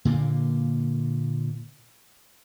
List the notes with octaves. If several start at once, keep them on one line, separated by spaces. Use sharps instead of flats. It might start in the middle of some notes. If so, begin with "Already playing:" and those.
A#2 D3 A#3